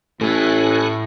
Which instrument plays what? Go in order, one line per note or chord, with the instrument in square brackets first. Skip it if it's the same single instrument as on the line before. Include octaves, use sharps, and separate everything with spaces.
[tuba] A1 [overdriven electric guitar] A2 A3 [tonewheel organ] A4 G#5 F#6